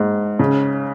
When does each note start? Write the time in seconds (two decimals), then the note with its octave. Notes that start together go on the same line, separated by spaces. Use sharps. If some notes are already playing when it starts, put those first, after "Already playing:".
Already playing: G#2
0.39 C#3